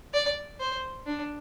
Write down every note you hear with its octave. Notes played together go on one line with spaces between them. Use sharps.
D5
C5
D4